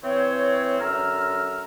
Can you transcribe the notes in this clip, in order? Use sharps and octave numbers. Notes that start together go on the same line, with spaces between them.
E3 C4 C#5
F#2 D3 A#5 E6 F6